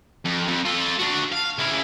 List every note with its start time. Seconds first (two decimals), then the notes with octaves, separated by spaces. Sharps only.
0.25 F2
0.48 F2
0.65 F4 A4
0.99 D4 F#4
1.32 F5
1.58 C#3 E4